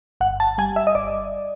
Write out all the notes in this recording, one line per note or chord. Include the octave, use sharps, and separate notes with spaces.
G1 F#5
A5
G3 G#5
E5
D#5
G1 D5